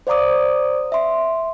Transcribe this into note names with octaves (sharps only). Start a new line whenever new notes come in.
C5 D5 F5 A#5 D6 D#6
E5 C6